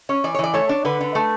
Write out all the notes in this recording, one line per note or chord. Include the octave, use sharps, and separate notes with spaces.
C#4 C#5
E3 D5
C#5
E3 D5
A3 C#5
D4
D3 B4
D3
A3